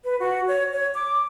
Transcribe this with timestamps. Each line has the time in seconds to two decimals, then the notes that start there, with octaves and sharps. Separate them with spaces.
0.03 B4
0.19 F#4
0.48 C#5
0.73 C#5
0.94 D6